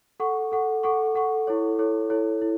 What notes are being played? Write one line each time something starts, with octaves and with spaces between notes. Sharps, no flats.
A4 F#5 C#6
A4 F#5 C#6
A4 F#5 C#6
A4 F#5 C#6
E4 A4 C#5
E4 A4 C#5
E4 A4 C#5
E4